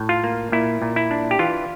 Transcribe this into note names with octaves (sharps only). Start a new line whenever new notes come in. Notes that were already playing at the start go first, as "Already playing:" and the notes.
Already playing: A2
F4
A#3
A#2 E4
A#2
E4
D4
G4
E3 F4